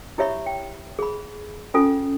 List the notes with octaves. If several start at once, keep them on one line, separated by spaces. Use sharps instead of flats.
E4 G4 C#5 E5 B5 C#6
G5
G#4 B5
C#4 F4 A4 G#5